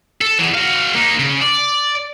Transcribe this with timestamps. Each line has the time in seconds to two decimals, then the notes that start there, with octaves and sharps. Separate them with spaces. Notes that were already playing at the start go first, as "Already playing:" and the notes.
0.21 A4
0.40 E2 E3
0.55 F#4 F5
0.95 A#3 D#4
1.19 C#3
1.41 D5